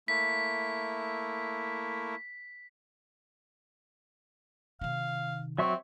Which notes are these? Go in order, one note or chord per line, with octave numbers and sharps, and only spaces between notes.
A3 A#3 E4 B6
C3 D#3 F5
F#3 C4 E5 C#6